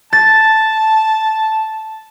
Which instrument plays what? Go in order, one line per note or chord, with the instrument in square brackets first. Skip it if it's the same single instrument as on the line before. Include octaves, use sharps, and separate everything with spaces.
[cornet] A5 [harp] A6